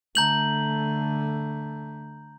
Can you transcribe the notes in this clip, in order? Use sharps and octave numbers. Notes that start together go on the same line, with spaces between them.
D3 A3 A#5 G6 F#7